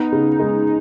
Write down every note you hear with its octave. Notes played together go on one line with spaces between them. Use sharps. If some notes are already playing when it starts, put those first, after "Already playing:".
Already playing: B3 D#4
C#3
G#3